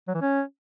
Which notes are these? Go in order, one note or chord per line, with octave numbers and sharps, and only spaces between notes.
F#3
E3
C#4